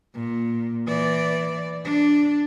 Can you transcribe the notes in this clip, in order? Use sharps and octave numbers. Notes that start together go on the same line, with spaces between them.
A#2
E3 D5
D4